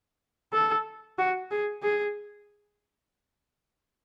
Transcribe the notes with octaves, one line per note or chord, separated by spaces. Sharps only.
A4
F#4
G#4
G#4